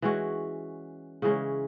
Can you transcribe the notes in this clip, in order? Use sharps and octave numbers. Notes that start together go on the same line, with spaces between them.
E3 G#3 C#4 F#4
C#3 E3 G#3 C#4